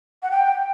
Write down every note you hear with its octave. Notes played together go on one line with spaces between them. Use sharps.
F#5
G5